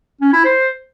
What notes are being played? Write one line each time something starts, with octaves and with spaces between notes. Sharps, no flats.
C#4
E4
C5